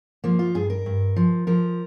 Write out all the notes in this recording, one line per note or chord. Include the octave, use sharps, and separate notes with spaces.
F3 A#3
F4
G2 G#4
A#4
G2
F3
F3 A#4